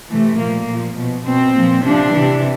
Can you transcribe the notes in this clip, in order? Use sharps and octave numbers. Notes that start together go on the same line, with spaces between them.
C3 E3 A3
A#2 F3 A#3
A#2 F3
B2
B2 C4
A#2 F3
C3 F3 D4
C3 E3